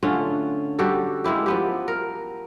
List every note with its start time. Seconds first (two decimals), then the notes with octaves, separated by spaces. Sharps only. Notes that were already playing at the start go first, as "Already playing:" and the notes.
0.03 D3 A3 C#4 F4
0.79 G3 F#4 G4 A4
1.24 G#3 A#3 E4 G4
1.46 F3 B3 G4
1.88 A#4